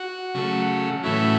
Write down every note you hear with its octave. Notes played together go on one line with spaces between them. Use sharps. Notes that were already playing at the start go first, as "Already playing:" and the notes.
Already playing: F#4
C#3 F#3 A3
A2 E3 A3 C#4 E4 F#4